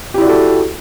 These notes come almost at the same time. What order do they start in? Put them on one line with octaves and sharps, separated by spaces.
G4 E4 D5 F#4 A4